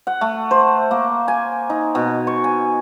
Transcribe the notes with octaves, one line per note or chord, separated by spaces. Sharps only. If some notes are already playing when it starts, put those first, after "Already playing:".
F#5
A3
C5
A#3
G#5
D#4
B2
C#6
G#5